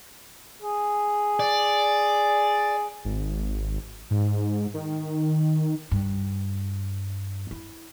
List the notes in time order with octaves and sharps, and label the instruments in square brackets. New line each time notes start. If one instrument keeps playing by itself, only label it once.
[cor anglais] G#4
[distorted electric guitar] D5
[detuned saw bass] G#1
G#2
D#3
[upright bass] G2
E4